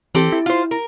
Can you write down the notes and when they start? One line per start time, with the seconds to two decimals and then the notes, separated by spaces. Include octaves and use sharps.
0.15 E3 C4 G4 A4
0.32 E4
0.46 F4 C5
0.71 A#4